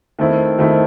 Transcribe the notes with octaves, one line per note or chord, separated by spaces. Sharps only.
D#3 A3 C4 E4
D#3 A3 C4 E4